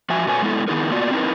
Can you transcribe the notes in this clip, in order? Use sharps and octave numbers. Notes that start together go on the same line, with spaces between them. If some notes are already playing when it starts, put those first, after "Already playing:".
F3 F#4 E5 G#5
B2 A3 F#4 B4 C#5 G#5
G#3 B3 E4 A4
D#3 B3 D#4 E4 G#4 A#4
A#3 B3 F4 F#4 D5
C4 D#4 E4 G4 A#4 B4